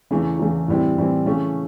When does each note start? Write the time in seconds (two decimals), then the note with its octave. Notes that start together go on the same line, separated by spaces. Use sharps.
0.11 E2 C#3 E3 A3
0.39 E2 C#3 E3 A3
0.68 A2 E3 G3 C4 E4
0.97 A2 E3 G3 C4 E4
1.26 C#3 E3 A3 C#4